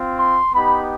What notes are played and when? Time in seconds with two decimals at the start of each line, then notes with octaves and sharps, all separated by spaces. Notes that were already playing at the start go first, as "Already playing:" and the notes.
Already playing: C4 F4
0.19 C6
0.53 B3 D#4 G4 B5